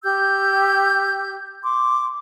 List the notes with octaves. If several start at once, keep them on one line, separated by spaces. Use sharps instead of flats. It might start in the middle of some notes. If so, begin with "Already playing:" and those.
G4 E6 G6
C6 D6